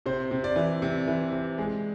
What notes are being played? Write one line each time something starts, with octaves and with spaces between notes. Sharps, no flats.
C3 C5
C3
D5
E3
C3
E3
C3
G#3